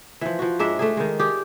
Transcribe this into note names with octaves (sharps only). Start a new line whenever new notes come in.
E3 F3
F3 F#4
G#2 G#3 D4 E5
A3 D4 G#4
D#3 G#3
G4 G#4 D5